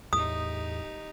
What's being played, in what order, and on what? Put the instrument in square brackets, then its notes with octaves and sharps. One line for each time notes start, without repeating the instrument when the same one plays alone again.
[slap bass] E2 A2 [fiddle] D#4 G4 [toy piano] D#6